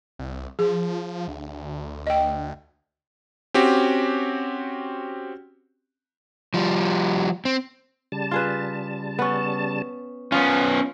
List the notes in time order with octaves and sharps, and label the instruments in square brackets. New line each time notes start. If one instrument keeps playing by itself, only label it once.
[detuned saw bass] C2
[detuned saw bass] F3 [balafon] G#4
[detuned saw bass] D2
[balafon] D#5 G5
[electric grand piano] C4 C#4 F#4 G4
[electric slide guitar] F3 G3
C4
[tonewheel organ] C#3 G3 A5
[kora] F4 G#4 B4
B3 C#4
[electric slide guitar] B3 C#4 [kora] F4